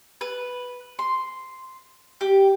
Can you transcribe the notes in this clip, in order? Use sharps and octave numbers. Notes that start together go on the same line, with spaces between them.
B4
C6
G4